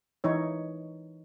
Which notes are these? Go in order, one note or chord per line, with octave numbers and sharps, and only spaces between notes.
E3 D#4 C#5